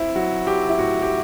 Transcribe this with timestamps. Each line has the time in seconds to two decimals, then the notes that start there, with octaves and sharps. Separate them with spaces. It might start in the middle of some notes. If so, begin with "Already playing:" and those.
Already playing: C4 E4
0.15 F#3 F#4
0.47 F#3 G4
0.69 E4
0.79 A2 F#4
1.02 G4